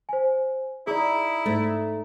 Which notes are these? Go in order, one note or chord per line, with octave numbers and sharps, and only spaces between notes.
C5 G#5
D#4 E4 G#4 D5
G#2 A3